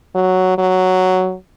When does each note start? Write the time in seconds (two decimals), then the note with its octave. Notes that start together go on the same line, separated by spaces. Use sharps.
0.15 F#3
0.58 F#3